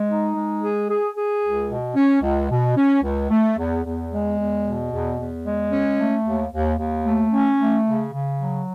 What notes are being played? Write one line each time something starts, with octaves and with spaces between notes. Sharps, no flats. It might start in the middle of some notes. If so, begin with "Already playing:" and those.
Already playing: G#3
D#4
G#3
G#4
G#4
G#4
C#2
B2
C#4
C#2
B2
C#4
C#2
A3
E2
E2
G#3
E2
B2
E2
E2
G#3
C#4
A3
D#2
D#2
D#2
A3
C#4
A3
C#3
C#3
F#3